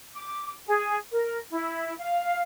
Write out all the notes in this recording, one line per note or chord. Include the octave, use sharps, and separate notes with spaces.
D6
G#4
A#4
E4
F5